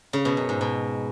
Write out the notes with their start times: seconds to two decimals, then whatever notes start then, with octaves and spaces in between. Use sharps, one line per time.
0.13 C#3
0.25 B2
0.37 F#2
0.49 G#2
0.61 B2